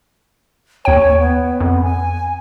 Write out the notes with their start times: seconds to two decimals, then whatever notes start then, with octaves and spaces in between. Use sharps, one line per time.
0.85 D#2 C#5 G5
1.19 B3
1.60 F2
1.83 G#5